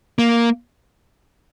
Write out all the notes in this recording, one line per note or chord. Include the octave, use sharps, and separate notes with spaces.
A#3